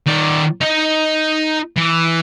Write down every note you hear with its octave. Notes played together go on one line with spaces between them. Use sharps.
D#3 D5
D#4 D#5
E3